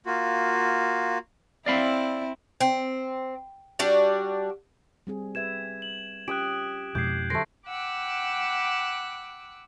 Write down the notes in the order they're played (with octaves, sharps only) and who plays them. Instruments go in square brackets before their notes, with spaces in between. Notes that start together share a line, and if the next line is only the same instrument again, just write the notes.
[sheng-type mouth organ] A#3 F4 F#4
[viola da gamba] C4 E4 [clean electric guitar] D5 F5 B5
[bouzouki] C4
G3 D4 F#4
[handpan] G3 C4 G#4
[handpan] G4 B4 E5 [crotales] G#6 E7
[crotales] F#7
[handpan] C#4 F4 [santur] G4 D#6 [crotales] F#6 D7
[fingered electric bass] F2 B2 G#3 [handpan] E4 [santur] D6 [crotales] G6 G#6 C7
[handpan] D3 F#3 A4 [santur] A3 C5 [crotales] A#6 C7 D7
[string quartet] F#5 G5 B5 D6 E6 F#6